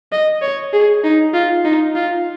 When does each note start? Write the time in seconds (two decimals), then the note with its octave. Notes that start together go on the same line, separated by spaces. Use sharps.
0.12 D#5
0.42 C#5
0.73 G#4
1.04 D#4
1.34 F4
1.65 D#4
1.95 F4